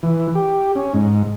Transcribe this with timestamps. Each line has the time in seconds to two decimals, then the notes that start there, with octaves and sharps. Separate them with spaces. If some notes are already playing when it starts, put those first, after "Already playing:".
0.03 E3
0.35 G4
0.75 C#4
0.94 G#2